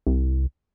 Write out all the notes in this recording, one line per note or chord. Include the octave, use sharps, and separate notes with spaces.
C2